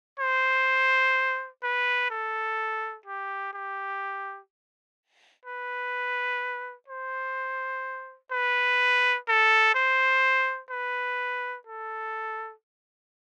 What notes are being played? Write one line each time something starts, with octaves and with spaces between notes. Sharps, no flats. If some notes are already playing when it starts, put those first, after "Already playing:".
C5
B4
A4
G4
G4
B4
C5
B4
A4
C5
B4
A4